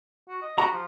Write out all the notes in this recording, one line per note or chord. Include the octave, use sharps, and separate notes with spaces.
F#4
D#5
F#4 G4 A#5
F3